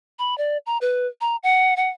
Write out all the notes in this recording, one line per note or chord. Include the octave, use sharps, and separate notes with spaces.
B5
D5
A#5
B4
A#5
F#5
F#5